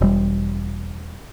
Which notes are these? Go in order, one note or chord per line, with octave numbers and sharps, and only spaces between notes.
E1 G3